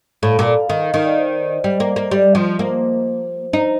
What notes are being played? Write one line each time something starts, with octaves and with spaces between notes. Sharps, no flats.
A2 F5
A#2
F5
D#3 D#5
D#3 D#5
D5
C5
D5
D#5
G3
A#3
A#3
G3
F3
A#3 C5
D#4 C5